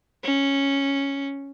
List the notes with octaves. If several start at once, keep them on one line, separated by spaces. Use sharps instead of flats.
C#4